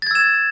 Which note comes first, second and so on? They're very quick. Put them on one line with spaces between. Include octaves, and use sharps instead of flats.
A6 G#6 E6 E7